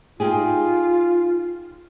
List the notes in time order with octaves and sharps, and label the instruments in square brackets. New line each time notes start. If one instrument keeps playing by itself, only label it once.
[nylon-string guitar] D#4 G4 G#4 [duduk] F4